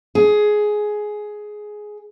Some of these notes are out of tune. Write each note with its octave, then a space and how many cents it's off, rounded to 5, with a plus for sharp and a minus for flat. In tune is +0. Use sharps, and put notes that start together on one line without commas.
G#4 +10